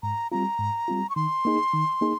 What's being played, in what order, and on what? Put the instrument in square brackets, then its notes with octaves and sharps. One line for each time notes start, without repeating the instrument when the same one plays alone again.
[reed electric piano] G#2 [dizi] A#5
[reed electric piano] G3 C4 F4 [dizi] A#5
[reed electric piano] G#2
G3 C4 F4
[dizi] C#6
[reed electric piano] D#3 [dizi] C6
[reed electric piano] A#3 D#4 G#4
D#3
A#3 D#4 G#4